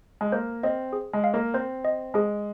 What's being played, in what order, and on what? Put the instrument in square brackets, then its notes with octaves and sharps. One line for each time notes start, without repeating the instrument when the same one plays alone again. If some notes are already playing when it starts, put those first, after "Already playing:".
[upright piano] G#3
[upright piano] A#3 [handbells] C5
[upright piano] C4 [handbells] D#5
[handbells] G#4
[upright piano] G#3
[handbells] F5
[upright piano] A#3
[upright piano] C4 [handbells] C5
[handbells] D#5
[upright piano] G#3 [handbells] G#4